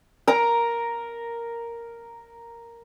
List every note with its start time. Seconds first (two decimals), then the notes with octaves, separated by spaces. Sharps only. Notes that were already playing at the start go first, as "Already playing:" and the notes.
0.27 A#4 A#5